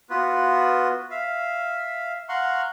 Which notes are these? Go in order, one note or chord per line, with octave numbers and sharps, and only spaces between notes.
B3 F4 F#4 B4
E5 F5
F5 F#5 A#5 C6 C#6